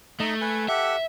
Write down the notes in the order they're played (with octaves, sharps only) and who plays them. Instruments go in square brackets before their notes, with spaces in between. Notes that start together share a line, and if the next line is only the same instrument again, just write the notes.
[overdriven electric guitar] A3 [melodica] D#4 D#5
[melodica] B4 G#5
[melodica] G4 A4 F#5 [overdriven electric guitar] E5